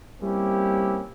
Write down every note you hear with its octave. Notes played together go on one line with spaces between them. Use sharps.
G3 A#3 C4 C#4 E4 G4